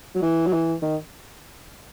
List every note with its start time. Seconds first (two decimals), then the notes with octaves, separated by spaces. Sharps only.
0.15 F#3
0.22 E3
0.47 F#3
0.53 E3
0.82 D#3